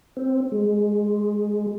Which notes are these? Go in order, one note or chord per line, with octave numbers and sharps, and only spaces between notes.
C4
G#3